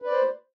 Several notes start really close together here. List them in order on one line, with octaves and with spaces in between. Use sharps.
B4 D5 C5